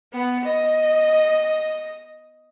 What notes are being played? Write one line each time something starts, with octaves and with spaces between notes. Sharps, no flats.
B3
D#5